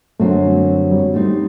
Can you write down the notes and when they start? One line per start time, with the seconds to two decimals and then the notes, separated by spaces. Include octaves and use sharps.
0.19 F#2 D3 F#3 A3 C4
0.43 G3
0.91 G3
1.14 G3 A3 C4 D#4